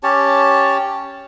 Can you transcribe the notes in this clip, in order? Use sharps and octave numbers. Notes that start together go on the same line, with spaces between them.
C#4 G4 C#5 A5